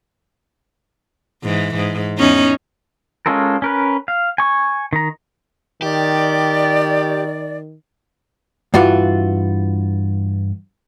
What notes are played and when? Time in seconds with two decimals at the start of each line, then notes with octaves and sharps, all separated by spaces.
1.44 G#2 E3
1.76 G#2
2.18 E2 C#4 D#4
3.26 G#3 C#4 F4 A4 A#4
3.62 C#4 A#4 B4
4.08 F5
4.38 G#5 C#6
4.93 D#3 A#5
5.82 D#3 G4 D5
8.74 G2 E3 F4 F#4